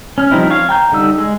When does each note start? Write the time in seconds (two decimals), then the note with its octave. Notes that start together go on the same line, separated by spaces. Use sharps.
0.18 C#4 F6
0.31 F3 G3 C4 D#4 E4
0.51 C#5 F5
0.69 G5 A#5 G6
0.92 D3 G3 D#4 E6
1.18 G#3